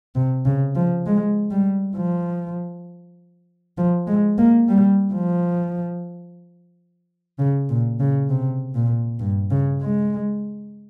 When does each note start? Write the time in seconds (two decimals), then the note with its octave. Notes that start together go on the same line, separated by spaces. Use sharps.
0.15 C3
0.45 C#3
0.75 F3
1.06 G#3
1.51 G3
1.96 F3
3.78 F3
4.07 G#3
4.38 A#3
4.69 G3
5.14 F3
7.39 C#3
7.69 A#2
8.00 C#3
8.30 C3
8.75 A#2
9.20 G2
9.51 C#3
9.81 G#3